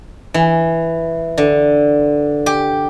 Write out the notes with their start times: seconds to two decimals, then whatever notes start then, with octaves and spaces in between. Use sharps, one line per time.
0.34 E3
1.38 D3
2.46 G4